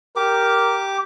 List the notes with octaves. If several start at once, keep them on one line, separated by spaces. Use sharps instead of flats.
G4 A#4 D6